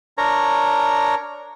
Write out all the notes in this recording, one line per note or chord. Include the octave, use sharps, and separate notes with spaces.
D4 A#4 C#5 A#5